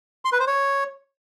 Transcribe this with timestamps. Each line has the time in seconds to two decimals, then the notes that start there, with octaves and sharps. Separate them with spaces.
0.25 C6
0.32 B4
0.40 C5
0.47 C#5